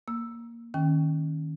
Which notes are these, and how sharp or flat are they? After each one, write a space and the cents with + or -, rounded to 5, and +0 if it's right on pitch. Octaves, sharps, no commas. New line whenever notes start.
A#3 +0 E6 +0
D#3 +0 C#4 +0 G5 +0